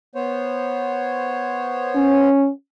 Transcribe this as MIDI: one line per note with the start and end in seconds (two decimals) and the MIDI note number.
0.15 2.29 59
0.15 2.29 72
0.15 2.29 73
1.96 2.50 61